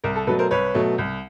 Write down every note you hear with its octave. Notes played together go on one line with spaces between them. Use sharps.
C2 A#4
A4
B2 F#3 A3 A4 B4
A#4 C5
C2 B4 C#5
B2 F#3 A3
C2